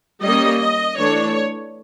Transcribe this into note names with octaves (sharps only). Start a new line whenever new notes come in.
G3 A#3 C#4 D#5
D#5
E3 A3 D4 C#5